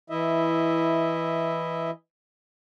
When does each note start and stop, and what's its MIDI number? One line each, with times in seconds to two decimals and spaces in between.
0.10 1.90 52
0.10 1.90 64
0.10 1.90 75
0.10 1.90 76